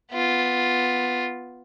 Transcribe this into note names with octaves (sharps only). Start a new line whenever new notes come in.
B3 F4